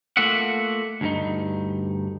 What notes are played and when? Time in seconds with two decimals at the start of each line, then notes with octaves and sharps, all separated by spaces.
0.17 A3 A#3 F4 F#4 E5 F#5
1.01 D2 G2 D#4